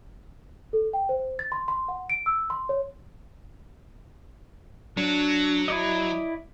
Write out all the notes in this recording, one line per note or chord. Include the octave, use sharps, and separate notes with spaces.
A4
G5
C5
A6
C6
C6
F#5
D7
E6
C6
C#5
F#3 D4
E4 D5 D#5